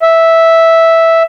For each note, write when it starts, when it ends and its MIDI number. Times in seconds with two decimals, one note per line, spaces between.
0.02 1.23 76